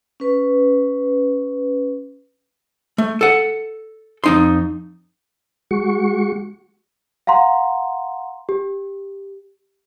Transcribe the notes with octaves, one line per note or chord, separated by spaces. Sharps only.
C#4 B4
A3
A4 F#5
F2 D#4 C6
G#3 F#4 C#6
F5 F#5 A#5 C6
G4